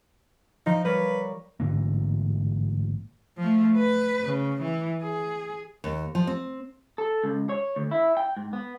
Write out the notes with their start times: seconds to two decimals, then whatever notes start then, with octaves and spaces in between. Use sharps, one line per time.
0.66 F3 D#4
0.85 G3 A#4 B4 C#5
1.60 A1 G#2 D3 A#3
3.38 F3 A3
3.77 B4
4.25 C#3
4.62 E3
5.03 G#4
5.84 D#2
6.15 F3
6.27 C4
6.98 A4
7.24 C#2
7.49 C#5
7.76 D2
7.91 E4
8.17 G5
8.37 G#2
8.53 B3